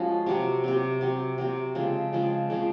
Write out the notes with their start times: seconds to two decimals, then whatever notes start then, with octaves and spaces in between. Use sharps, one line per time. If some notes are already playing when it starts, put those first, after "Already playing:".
Already playing: F3 G#3 C#4 F#4
0.26 C3 F#3 C4
0.64 C3 F#3 C4
1.01 C3 F#3 C4
1.38 C3 F#3 C4
1.75 C#3 F3 G#3 C4
2.13 C#3 F3 G#3 C4
2.50 C#3 F3 G#3 C4